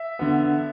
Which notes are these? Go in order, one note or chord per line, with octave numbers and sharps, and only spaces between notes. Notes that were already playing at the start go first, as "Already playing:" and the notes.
Already playing: E5
D3 B3